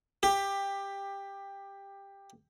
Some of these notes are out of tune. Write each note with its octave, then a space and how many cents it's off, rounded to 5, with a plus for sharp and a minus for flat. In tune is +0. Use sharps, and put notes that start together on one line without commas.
G4 +15